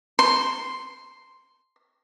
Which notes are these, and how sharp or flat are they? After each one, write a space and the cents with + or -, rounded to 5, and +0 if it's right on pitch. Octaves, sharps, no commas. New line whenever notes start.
C6 +0